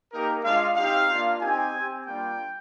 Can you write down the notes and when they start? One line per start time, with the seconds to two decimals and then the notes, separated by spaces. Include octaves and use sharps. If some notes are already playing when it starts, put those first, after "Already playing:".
0.12 A#3 D#4 G4 A#4
0.44 G#3 D4 F4 F5
0.76 C4 D#4 G4 F5
1.09 A#3 D4 F4
1.41 C4 D#4 G4 G#5
1.73 C4 G4
2.06 G3 A#3 D4 F4 G5